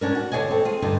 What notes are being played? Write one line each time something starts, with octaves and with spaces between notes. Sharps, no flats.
C#4 D4 A#4
F#4
D3 D4 G#4 C#5 D#5 G#5
C4 A4
F4 G#4
G2 D3 D#4